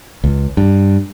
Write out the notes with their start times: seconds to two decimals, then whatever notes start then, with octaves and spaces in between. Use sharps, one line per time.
0.24 C#2
0.57 G2